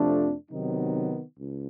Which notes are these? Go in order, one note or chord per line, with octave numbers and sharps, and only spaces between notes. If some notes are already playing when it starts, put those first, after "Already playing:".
Already playing: F2 C3 F3 A3 D4
C3 D#3 F#3 B3 D#4
C#2